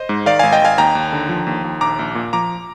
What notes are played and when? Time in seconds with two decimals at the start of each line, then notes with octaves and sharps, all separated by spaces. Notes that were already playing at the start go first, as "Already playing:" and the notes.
Already playing: C5 D#5
0.09 G#2
0.26 D#3 D5 F5
0.39 G#1 F5 G#5
0.53 D#5 G5
0.61 G#1 F5 G#5
0.78 D#2 G5 A#5
0.95 D#2
1.12 D3
1.29 F3
1.47 D#2
1.64 D#2
1.81 A#1 A#5 D6
1.99 A#1
2.15 A#2
2.33 F3 A#5 D6